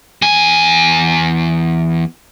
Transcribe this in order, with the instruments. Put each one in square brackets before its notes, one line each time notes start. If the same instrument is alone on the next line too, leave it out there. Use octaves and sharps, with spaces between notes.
[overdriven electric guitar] E2 G#5